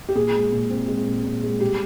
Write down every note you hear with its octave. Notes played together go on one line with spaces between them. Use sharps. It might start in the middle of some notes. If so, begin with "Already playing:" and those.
G4
A#2 G#4
G#3
A#2
C4
G#3
A#2
A#2
G#3
G3 G4